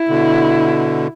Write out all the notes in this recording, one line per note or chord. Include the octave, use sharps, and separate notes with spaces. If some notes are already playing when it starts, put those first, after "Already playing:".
Already playing: E4
B2 D3